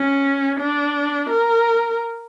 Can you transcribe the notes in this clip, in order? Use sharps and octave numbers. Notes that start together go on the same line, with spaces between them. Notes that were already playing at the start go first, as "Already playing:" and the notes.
Already playing: C#4
D4
A#4